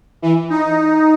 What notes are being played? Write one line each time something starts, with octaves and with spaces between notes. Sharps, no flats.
E3
D#4